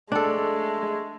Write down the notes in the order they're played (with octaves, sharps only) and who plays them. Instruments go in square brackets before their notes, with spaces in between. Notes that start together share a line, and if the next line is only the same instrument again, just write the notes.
[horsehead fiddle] G#3 A3 [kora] D4 A4